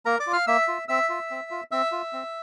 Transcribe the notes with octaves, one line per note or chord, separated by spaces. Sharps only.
A#3 A#4 A#5
D5 D6
F4
F5 F6
A#3 E5 E6
F4
C4 E5 E6
F4
C4
F4
C4 E5 E6
F4
C4